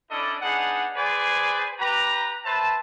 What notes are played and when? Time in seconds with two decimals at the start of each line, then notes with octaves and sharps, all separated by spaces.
0.10 C#4 D4 E4 A4 D5 D#5
0.42 B3 D4 D#4 G#4 F#5
0.96 G#4 B4 C5 D5 G#5
1.80 G4 B4 A#5
2.45 B4 C5 E5 A5